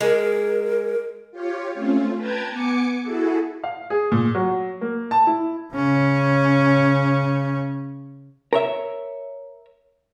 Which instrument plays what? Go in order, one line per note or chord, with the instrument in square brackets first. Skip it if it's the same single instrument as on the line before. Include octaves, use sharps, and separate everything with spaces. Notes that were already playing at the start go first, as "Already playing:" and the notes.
[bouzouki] G#3 [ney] A#4
[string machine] F4 G4 C#5
A3 C4 C#4 F4
B4 G5 A5 A#5 G#6
B3 G#5 D6 C#7
E4 F#4 G#4 A4
[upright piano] F5
G#4
A#2
F#3
A#3
A5
E4
[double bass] C#3 C#4
[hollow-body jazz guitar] A#4 C#5 E5